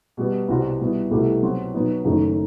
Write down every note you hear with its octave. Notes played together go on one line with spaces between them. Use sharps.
B2 G3 B3
C2 B2 G3 C4 F#4
B2 G3 B3 E4
C2 B2 A3 E4 G4
B2 F#3 C4
B2 F#3 B3 D#4
F#1 F#2 D#3 A3 D#4